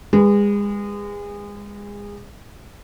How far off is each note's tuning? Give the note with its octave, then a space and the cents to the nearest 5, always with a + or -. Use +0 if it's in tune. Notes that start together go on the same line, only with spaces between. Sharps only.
G#3 -30 B4 +0